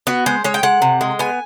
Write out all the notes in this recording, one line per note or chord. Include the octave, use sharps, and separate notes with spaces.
B3 F#4
G#3 C5
G#3 C#5
G5
G#3 F#5
C3
G#3
B3 G#5